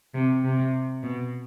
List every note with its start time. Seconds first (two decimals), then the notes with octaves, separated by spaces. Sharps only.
0.14 C3
0.45 C3
1.03 B2